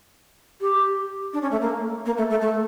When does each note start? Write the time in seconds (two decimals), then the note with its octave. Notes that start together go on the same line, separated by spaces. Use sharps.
0.61 G4
1.33 D4
1.42 C#4
1.51 A3
1.61 A#3
2.05 A#3
2.17 A3
2.30 A3
2.41 A3